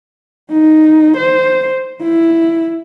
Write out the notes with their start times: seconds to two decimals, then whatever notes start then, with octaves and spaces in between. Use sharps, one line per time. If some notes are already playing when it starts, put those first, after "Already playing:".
0.51 D#4
1.17 C5
2.02 E4